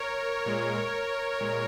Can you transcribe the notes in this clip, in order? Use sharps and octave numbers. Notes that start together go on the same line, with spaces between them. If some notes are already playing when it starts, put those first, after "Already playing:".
Already playing: A#4 C#5
A#2 G#3
A#2 G#3